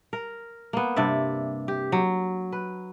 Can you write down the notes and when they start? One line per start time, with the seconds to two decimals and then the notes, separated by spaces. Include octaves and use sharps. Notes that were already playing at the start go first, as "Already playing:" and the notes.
0.13 A#4
0.73 A#3 B3
0.96 G2 C3 D5 E5
1.68 G4
1.92 F#3
2.52 B4